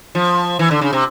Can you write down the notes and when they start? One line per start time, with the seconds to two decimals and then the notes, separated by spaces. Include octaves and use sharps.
0.15 F3
0.59 E3
0.71 D3
0.81 C#3
0.93 C3